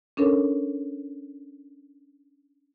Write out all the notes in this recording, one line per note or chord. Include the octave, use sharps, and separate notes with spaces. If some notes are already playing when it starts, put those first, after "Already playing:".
C#4 D4 A4 A#4 C#5